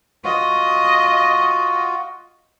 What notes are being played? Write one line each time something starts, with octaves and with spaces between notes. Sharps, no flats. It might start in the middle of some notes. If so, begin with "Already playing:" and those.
F4 F#4 D#5